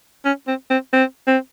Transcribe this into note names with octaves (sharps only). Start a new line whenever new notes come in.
C#4
C4
C4
C4
C4